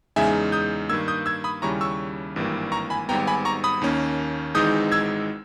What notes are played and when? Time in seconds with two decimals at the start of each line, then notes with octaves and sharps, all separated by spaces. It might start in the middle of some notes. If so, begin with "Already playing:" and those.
0.16 E2 C#3 G#3 D#4 E5 G#5
0.52 D#6 G6
0.89 G2 D#3 A#3 E6 G#6
1.08 D#6 G6
1.26 E6 G#6
1.44 B5 D#6
1.62 D#2 C#3 G3 C#4 E4 A#5 C#6
1.81 C#6 E6
2.36 G#1 G2 E3 G3 A#3
2.72 A#5 C#6
2.90 G#5 B5
3.09 G#1 G#2 G3 B3 G5 A#5
3.27 G#5 B5
3.45 A#5 C#6
3.64 B5 D#6
3.81 D#2 D#3 A#3 C#4
4.55 G#1 G#2 E3 G#3 D#4 D#6 G6
4.92 E6 G#6